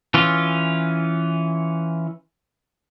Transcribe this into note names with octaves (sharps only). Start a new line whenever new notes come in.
E3 C#4 F4